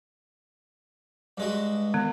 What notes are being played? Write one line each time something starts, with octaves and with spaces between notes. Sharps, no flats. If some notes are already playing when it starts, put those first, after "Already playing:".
G2 G#3 F#4
D#3 B3